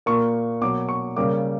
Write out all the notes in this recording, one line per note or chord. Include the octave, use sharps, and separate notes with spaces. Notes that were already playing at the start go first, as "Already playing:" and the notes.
A#2 A#3 C#6
B2 F#3 A#3 D6
C#6
C#3 G3 A#3 D6